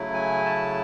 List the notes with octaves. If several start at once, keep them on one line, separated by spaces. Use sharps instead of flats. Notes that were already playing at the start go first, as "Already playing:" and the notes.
Already playing: C#3 F#3 A3 E4
G#5
A5